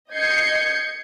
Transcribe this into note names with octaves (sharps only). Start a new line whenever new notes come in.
D#5 G6 G#6 C7 C#7